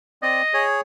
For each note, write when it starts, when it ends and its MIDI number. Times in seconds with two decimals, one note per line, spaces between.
0.22 0.42 60
0.22 0.42 74
0.22 0.63 75
0.54 0.81 68
0.54 0.81 73